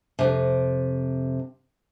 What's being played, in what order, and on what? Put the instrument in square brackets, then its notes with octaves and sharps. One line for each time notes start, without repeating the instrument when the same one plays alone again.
[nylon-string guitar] F2 G#2 C3